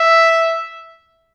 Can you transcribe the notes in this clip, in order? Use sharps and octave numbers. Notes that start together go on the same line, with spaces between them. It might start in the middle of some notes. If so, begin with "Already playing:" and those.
Already playing: E5